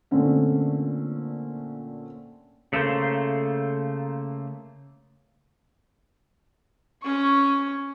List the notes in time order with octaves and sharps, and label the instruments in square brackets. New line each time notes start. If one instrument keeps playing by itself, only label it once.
[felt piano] A#2 D3 A3 C4 C#4
[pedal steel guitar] C#3 A3 A#3 C5
[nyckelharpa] C#4 C#6